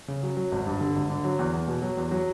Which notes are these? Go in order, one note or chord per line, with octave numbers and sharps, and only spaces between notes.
C#3
F#3
F#3
G#1
G2
D3
G#1
D3
F#3
E2
E2
B2
F#3
E2
F#3